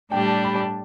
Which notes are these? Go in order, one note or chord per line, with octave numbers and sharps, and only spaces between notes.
A2 G3 D4 G4 G5
A5
B5
A5